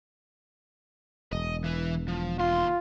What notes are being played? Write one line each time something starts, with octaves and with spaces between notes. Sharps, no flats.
E1 D#5
E3 B4
F3
D#2 F4 C6